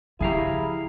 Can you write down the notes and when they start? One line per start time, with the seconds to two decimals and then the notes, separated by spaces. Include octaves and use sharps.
0.21 C#3 F3 E4 G4 G#4 F5 A#5